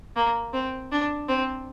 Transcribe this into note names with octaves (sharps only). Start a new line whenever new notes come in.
A#3
C4
D4
C4